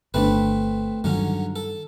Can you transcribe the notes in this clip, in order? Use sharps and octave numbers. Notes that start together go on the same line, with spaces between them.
G1 B2 A3 C4 D4 B4
G2 D3 D#3 F#3 C#4
A4